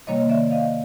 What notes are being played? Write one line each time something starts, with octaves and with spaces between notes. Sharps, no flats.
C3 D#3 G3 A#3 C#5 D#5
D5 E5
D#5 F5